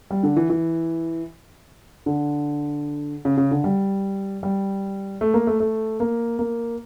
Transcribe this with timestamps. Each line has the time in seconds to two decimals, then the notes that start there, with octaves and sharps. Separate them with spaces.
0.10 G3
0.23 D3
0.37 E3
0.50 E3
2.06 D3
3.25 C#3
3.37 C#3
3.51 D3
3.64 G3
4.43 G3
5.21 A3
5.34 A#3
5.47 A3
5.60 A3
6.00 A#3
6.39 A#3